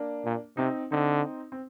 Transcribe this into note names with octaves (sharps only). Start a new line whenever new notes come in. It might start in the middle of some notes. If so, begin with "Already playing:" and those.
Already playing: A#3 D4
A#2
C3 C4 D#4
D3 C4 D#4
C4